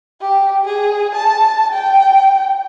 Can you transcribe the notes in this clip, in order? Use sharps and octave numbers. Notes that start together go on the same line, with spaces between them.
G4
G#4
A5
G5